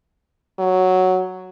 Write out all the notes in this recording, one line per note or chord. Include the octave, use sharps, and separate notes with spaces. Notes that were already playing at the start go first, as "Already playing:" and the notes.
F#3